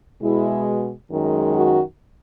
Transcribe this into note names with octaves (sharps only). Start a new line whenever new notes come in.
B2 G#3 E4
F#2 D#3 G#3
F#4